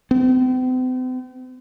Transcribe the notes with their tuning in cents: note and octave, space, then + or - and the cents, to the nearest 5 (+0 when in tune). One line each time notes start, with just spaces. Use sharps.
C4 -45